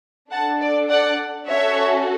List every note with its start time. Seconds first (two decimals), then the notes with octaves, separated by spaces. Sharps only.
0.31 D4 A4 F#5 A5
0.60 D5
0.89 D5 F#5
1.47 C#4 F#4 A4 C#5 E5